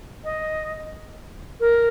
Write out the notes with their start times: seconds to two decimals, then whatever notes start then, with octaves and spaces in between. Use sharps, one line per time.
0.24 D#5
1.60 A#4